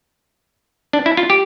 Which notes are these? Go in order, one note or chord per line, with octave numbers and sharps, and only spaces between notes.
D4
E4
F4
G4